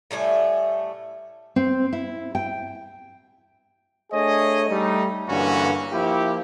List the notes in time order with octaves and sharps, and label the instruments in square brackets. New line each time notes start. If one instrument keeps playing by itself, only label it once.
[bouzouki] A2 G3 A3 G#5
[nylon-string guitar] C4
E4
G5
[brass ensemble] A3 D4 G#4 C#5 D#5
G3 A3 D#4
G2 D3 E3 A#3 C#4 F#4
F3 A#3 E4 G4